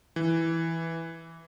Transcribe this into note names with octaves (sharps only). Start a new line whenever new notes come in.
E3